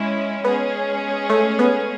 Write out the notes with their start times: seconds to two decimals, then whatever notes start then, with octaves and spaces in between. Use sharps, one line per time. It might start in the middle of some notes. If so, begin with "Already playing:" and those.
Already playing: G#3 C#4 E4
0.45 G#3 B3 C#4 G#4
1.30 A3
1.59 B3